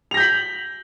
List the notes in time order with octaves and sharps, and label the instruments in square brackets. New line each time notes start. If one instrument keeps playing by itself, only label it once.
[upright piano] F7
A#6
G6
B6
F#7